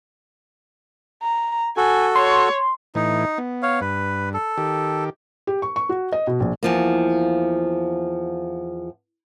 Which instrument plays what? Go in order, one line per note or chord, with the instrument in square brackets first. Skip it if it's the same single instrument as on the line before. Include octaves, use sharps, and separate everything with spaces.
[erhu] A#5
[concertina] F#4 A4 [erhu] G#5
[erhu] C#5 [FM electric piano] C6
[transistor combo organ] A2 E3 [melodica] D#4
[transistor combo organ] B3
[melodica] C#5 F5
[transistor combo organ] G2 [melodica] B4
[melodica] A4
[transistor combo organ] D#3 G4
[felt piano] G4
C#6
C#6
F#4
D#5
B2
A#1
[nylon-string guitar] E2 F3 A#3